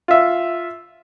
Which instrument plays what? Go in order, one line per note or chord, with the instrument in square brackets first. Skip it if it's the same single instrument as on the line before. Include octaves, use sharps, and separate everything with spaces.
[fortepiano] F4 E5